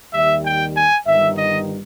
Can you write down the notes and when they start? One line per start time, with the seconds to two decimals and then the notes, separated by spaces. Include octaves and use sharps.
0.13 D#2 D#3 G3 E5
0.44 G5
0.76 G#5
1.06 G1 G2 D#3 G3 E5
1.37 D#5